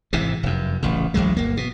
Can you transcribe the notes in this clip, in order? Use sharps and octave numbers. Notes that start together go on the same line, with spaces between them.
G#1 G#2 C3 E3
F1 F#2
D1 A1 C#3
A1 D2 F#3 G#3
G1 A#3
B2